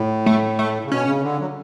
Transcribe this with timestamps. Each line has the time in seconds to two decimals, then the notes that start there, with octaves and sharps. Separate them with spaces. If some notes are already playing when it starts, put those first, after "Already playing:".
Already playing: A2
0.26 A3
0.59 A3
0.85 C#3
0.91 B2 C#4
1.07 C#3
1.23 D3
1.40 F#3